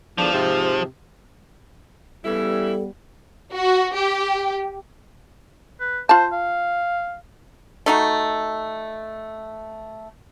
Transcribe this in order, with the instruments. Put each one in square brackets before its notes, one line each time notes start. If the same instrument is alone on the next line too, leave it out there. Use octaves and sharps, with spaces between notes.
[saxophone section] E2 D3 D4 [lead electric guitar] F3
[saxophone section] G#2 C3
[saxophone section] C#3 E3 E4 [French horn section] G3 B3 [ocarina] A4
[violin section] F#4
G4
[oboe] B4
[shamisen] F4 A5 [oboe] C5
[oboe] F5
[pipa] A3 D#4 F#4